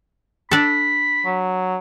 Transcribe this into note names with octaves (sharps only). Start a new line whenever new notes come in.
D4 A4 B5
F#3